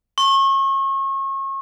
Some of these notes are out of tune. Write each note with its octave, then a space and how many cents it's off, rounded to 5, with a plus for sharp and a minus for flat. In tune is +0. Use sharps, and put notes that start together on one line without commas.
C#6 -35